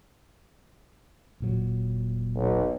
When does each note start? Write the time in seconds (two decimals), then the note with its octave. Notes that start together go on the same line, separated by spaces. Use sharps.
1.40 D#1 A#2 F#3
2.36 B1